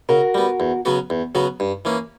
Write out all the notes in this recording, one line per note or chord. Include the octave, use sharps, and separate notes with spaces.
C#3 F#4 A#4
G3 B3
E2
C#3 F#3 B3 F#4
E2
C#3 F#3 B3 F#4
G2
E3 A#3 C#4